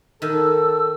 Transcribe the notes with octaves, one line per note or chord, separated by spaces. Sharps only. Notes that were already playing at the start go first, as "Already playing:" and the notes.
D#3 A4 E6